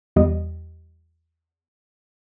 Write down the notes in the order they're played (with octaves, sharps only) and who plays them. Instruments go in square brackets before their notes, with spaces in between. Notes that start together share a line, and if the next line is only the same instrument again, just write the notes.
[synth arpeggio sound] E2 G3 D#5